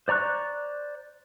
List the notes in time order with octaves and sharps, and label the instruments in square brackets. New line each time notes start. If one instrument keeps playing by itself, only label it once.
[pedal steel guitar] C5 D5 A#5 C#6 F#6